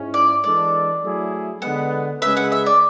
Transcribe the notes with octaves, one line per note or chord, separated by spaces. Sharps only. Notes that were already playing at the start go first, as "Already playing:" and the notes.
Already playing: G#2 G#3 C#4 E4
D5
E3 G#3 D4 A4 D5
F#3 A3 E4 G#4
D3 G#3 B3 F#5
C#3 G#3 C#4 G#4 B4 E5
F#5
E5
D5